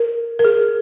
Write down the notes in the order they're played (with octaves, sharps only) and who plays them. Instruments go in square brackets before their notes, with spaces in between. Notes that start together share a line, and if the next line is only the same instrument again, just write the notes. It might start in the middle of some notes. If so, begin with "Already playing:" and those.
Already playing: [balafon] A#4
A#4
G#4